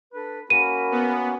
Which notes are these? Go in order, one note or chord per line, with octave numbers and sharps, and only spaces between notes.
D4 A4 B4
A#3 C#4 F#4 A#4 B5 D#7
B3